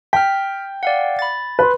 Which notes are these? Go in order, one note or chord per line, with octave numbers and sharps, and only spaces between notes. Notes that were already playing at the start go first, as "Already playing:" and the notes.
G5 F6 B6
D5 F5 F#5
B5 A6
B4 C6